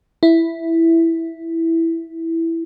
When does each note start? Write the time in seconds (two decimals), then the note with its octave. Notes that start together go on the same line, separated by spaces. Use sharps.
0.23 E4